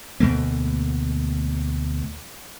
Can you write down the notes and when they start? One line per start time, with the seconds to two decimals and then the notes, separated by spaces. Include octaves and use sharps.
0.20 D2 B2 A3 A#3